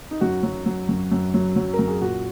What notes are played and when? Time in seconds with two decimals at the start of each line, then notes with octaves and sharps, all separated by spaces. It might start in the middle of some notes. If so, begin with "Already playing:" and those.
0.11 D#4
0.21 F#2 F#4
0.43 F#3
0.66 F#3
0.89 F#2
1.12 F#2
1.34 F#3
1.56 F#3
1.74 A#4
1.79 F#2
1.88 G#4
2.01 A#2 F#4